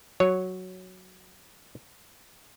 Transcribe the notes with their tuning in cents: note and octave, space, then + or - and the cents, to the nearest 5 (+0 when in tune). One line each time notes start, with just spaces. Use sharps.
F#3 +0 C#5 +0